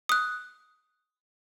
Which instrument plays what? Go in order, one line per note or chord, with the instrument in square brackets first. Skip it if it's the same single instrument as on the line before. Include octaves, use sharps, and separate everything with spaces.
[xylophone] D#6 F#6